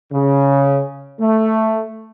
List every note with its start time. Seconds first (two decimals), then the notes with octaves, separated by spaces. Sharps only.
0.11 C#3
1.20 A3